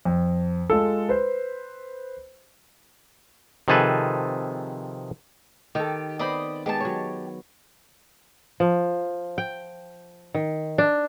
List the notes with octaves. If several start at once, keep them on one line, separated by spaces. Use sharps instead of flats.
F2
G#3 F4 A4
B4 C5
C3 D#3 F3 G#4 A4 B4
D#3 G4 A4
B3 C4 C5 D5 D#5 B5
G#3 B3 G4 A5
F#3 C#5
F3
G5
D#3
D4